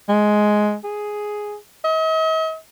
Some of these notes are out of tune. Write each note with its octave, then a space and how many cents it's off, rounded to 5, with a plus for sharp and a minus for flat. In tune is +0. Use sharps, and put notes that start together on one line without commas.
G#3 +10
G#4 +5
D#5 +45